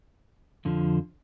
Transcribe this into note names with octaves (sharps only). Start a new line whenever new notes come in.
F2 D3 F3